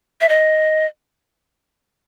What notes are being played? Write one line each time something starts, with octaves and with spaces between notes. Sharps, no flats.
E5
D#5